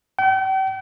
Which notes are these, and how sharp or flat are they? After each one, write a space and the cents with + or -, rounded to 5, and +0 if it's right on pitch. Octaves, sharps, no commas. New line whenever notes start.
G5 -40